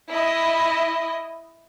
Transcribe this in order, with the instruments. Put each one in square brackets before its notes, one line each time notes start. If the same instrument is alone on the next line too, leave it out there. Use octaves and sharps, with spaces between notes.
[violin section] E4 D#5